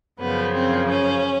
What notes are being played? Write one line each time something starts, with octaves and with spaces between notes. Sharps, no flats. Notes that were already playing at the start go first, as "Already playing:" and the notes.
F#2 C#3 F3 B3
C4
C#4